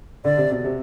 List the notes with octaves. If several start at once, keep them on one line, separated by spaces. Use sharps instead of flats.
D3 D5
C3
B2
C3